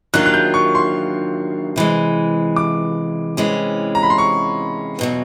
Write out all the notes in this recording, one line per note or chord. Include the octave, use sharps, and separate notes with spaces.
D#3 F#3 A#3 D4 F4 F#6
F#6
G6
C#6
C6
C3 E3 G#3
D6
C3 E3 G#3 C#4
A#5
B5
C6
C#6
E2 B2 F#3